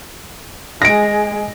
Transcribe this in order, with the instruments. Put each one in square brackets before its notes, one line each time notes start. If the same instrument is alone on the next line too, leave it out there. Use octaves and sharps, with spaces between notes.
[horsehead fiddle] G#3 G#4 [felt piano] A#6 D7